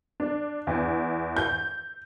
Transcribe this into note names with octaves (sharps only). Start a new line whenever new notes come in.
D4
E2
G6